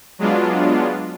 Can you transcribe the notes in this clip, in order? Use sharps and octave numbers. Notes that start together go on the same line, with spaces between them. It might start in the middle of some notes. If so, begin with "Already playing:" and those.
F#3 G#3 B3 D4 F4